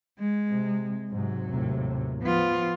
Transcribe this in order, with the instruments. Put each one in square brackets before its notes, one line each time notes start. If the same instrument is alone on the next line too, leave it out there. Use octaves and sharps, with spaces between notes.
[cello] G#3
[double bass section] C3
[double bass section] G#2 C3 [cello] F#3
[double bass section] D#2 A2 C3
[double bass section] F3 [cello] B3 F4